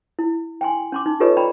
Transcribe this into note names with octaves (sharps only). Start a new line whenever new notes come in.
E4
G5 G#5 C6
C#4 C6 D6
D#4
F4 G4 A4 B4 C#5 D#5
D5 G5 A#5 B5